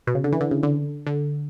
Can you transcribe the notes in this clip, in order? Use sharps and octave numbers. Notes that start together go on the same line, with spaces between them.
B2
C#3
D3
E3
D3
C#3
D3
D3